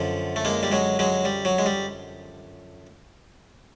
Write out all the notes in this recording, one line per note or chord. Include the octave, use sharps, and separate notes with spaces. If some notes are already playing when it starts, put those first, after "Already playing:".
Already playing: F#2 D3 F3
A3
G#3 A#3
G3
F#3 G#3
F#3 G#3
G3
F#3
G#3
G3